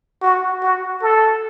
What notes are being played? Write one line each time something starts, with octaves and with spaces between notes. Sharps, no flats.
F#4
F#4
A4